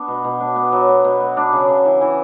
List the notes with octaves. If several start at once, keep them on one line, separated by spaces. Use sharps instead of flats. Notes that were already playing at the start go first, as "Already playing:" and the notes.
Already playing: B3 D4
B2
B2
D4
B3
F#3
B3
B2
B3
D4
C#3
C#3
E3
E3